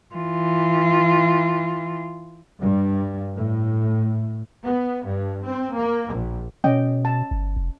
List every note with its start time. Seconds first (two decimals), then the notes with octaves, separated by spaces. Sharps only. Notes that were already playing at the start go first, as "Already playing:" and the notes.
0.15 E3 F4
2.60 G2
3.36 A2
4.65 B3
5.05 G2
5.46 C4
5.74 A#3
6.12 A#1
6.64 B2 C#4 D#5 G5
7.05 A5
7.31 G1
7.56 F1